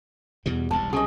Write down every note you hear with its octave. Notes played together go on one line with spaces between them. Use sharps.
E2 B2 E3 G3
E1 C2 G2 A5
B1 C3 G3 C#4 G#4 D#5